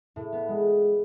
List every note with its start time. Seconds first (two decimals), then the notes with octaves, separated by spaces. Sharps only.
0.16 A2
0.32 B3
0.48 G#3